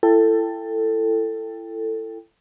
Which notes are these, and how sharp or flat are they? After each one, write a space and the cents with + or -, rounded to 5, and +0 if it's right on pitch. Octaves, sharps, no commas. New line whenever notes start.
E4 +30 A4 +15 G5 +15